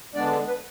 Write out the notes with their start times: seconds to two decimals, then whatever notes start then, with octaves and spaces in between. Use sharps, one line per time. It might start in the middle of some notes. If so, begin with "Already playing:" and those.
0.14 D3 G#3 B3 D4 D5
0.47 B4